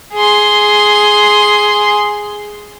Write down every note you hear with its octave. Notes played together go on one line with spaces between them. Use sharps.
G#4 C6